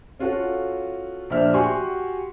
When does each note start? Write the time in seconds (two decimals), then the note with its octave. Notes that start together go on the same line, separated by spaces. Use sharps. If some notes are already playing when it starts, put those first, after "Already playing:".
0.19 C#4 F4 F#4 A4
1.30 A#1 D4 C5 E5 F6
1.54 F#4 G4 F#5 G#5 C6 C#6